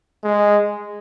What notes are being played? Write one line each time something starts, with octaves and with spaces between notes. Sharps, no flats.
G#3